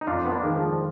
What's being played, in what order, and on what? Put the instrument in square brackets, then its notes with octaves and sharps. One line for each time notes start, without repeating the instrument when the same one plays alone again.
[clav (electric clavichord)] D#4
[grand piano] F2 [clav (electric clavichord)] D4 F4
[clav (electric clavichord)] B3
A#3 D4
[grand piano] D#3 G#3
[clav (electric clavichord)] F3